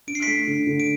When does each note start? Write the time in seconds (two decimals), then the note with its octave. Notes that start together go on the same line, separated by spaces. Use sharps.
0.07 D4 D7
0.15 C7
0.22 A3 B6 D7
0.47 D3
0.67 D3
0.80 D7